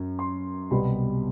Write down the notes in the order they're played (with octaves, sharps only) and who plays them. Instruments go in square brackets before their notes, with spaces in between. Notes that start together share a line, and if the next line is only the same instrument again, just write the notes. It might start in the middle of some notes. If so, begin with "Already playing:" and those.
Already playing: [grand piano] F#2
C6
C2 B2 G3 B3 B5